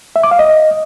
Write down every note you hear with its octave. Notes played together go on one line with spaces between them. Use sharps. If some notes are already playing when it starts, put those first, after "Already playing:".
E5
D6
F5
D#5